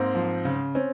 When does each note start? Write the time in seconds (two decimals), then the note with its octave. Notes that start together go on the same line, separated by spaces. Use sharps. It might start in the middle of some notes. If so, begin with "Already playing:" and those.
Already playing: G#2 A#3 C4
0.15 F3
0.45 C#3
0.75 C4 C#4